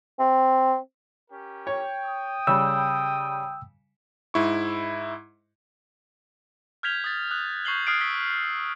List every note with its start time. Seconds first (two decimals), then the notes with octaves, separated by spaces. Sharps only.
0.19 C4
1.30 C#4 G4 A#4
1.67 C#5 G5
2.03 D#6
2.47 C#3 G3 E6
4.34 G#2 E4 C#6
6.83 F6 G6 G#6 B6 F7 G7
7.04 D#6 A6
7.31 D#6 F#6
7.65 C#6 G6 C7 F#7 G7
7.87 D#6 F6 F#6 G#6 C7 D7
8.01 E6 B6 G7